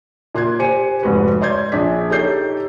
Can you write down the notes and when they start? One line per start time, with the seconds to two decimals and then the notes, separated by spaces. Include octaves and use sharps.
0.34 A#2 C6 F#6 G#6
0.59 G4 C5 G#5 C#7 D#7
1.03 F1 G#2 F#4 B4
1.41 C#5 D5 C6 G6 G#6
1.72 A#1 D4 G#4 B6
2.10 D#4 G4 A4 C#5 G6 C7